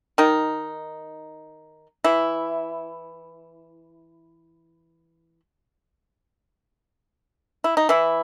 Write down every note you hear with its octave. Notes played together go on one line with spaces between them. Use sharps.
D#3 D#4
E3 E4
E4
D#4
E3 E4